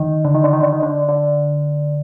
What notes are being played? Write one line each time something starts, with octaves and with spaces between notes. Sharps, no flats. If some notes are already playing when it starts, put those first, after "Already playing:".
Already playing: D#3
D3
D#3
D3
D#3
D3
D#3
D3
D3